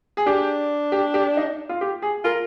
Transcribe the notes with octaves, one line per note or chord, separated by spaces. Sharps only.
G#4
D4 G4
G4
G4
D#4
F4
G4
G#4
F4 A#4